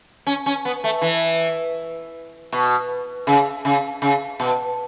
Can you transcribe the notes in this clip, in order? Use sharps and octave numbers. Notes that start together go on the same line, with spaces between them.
C#4
C#4
B3
A3
E3
B2
C#3
C#3
C#3
B2